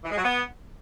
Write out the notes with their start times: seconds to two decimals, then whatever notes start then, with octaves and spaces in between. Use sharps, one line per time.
0.04 E3
0.11 G#3
0.17 F#3
0.24 B3